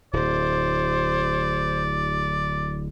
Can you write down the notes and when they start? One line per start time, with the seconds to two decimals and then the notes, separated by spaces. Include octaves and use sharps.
0.13 D1 C5 D5